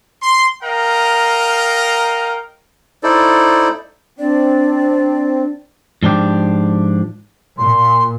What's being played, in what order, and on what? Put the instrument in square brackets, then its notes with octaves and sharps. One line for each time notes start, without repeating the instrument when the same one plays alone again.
[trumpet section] C6
A#4 D#5 F5 G5 A#5
[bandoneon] D#4 E4 A4 C5 D5
[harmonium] C4 [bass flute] D4 [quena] D5
[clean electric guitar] G#2 F3 D4 G4
[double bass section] A#2 [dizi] C6